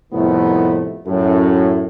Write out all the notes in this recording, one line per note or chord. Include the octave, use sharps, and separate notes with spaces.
C2 F2 A2 D#3 A3 B3
F#2 A2